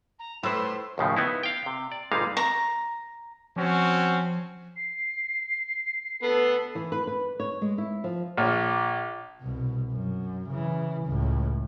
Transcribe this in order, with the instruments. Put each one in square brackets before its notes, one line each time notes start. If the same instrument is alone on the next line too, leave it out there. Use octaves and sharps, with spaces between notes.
[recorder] A#5
[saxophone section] A2 [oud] B4 C5 [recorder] C6 [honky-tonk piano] E6
[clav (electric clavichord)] D#2 A2 C#3 F3
B3 D#4 E4
F5 G5
C3
D5
G1 A#2 G3 G#3 D#4 F5
[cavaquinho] A#5
[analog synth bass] F3 [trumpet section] C4 C#4 F#4
[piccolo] C7
[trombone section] D2 A4 [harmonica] B3
[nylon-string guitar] E3
B4
B4
C#5
G#3
E4
F3
[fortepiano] A#1
[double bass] C2 B2
F#2
C#3 E3
C#2 A2